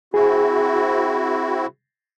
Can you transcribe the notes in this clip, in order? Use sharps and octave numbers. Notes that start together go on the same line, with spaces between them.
C4 E4 F#4 G#4